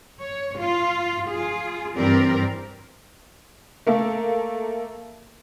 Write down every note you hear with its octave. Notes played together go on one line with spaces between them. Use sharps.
C#5
F4
F4 G#4
G2 E3 C4 G4 A#4 D5
A3 A#3 A4